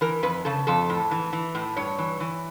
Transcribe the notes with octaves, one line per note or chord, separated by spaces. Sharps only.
E3 A#4
F2 B4
C#3 A4
F2 A4
A2
E3
E3
A2
G2 C#5
E3
E3